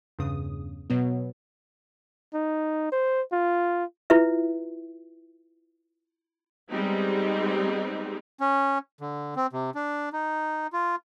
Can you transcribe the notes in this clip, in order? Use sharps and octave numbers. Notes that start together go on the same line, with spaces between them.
E2 G2 C#3 D#6
B2 F#3 B3
D#4
C5
F4
E4 F4 B4 E5
G3 G#3 B3 C4 D#4 G4
C#4
D3
C4
C3
D4
D#4
F4